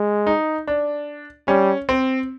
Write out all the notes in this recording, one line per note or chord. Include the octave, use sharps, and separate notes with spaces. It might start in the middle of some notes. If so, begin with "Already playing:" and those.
Already playing: G#3
D#4
D4
G3 C#4
C4